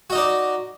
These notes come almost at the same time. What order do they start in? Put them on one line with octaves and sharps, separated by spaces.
F#4 D#5 D#4 D5